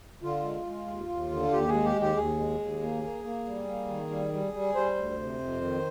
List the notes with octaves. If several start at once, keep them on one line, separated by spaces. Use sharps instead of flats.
D3 F4
G#3
G#3
D#2
D#2
D3
D#2 G4
G#4
G#3
G4
D#2
G4
D#2 G#4
G#3
D#2
A#3
A#3
A#3
G3
A#3
D#3
G3
G3
G3
G3 C5
D2
C3
F2
D#3